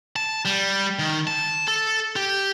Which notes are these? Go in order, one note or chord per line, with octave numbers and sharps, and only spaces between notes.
A5
G3
D#3
A5
A4
G4